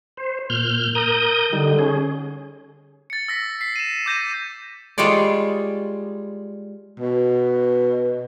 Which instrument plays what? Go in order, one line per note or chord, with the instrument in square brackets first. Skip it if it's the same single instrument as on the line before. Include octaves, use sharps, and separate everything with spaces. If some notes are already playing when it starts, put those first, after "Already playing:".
[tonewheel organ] C5
A#2 F6 G6
A#4 D#6 G6
[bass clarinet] D3 [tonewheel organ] G3 D#4
[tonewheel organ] C#4 G#4
[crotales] A6 C#7
E6 A#6 B6
B6 C7
D#7 E7
D6 G6 A#6 D#7
[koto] G3 G#3 F4 C#5 D5
[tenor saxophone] B2